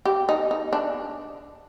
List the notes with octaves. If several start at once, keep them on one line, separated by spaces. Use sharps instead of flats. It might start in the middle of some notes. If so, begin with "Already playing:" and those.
G4
D#4
D#4
D4